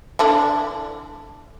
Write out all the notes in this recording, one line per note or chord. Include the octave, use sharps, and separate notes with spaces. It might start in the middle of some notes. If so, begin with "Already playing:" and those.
D3 D4 E4